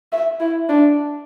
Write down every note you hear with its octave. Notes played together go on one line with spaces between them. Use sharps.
E5
E4
D4